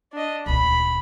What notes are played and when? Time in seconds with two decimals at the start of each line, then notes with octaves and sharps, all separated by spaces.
0.13 D4 D#5
0.46 D#1 D2 B5